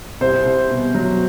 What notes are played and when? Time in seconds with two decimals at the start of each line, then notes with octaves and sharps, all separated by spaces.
0.21 C2 C5
0.45 C2
0.70 B2
0.95 F#3